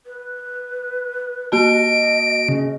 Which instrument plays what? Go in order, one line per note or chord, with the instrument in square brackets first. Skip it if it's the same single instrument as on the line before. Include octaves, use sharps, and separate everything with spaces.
[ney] B4
[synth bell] A#3 F#4 A5 [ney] D#5 [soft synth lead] D7
[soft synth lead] C#3